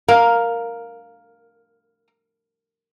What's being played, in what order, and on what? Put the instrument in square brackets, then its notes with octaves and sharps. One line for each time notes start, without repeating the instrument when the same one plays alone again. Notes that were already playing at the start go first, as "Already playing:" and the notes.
[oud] A#4 [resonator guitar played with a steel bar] F5